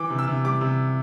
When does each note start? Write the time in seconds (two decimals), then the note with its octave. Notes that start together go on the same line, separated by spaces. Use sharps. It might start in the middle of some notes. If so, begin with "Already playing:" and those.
Already playing: E3 D6
0.10 C3
0.19 E6
0.28 C3
0.44 G3 D6
0.61 C3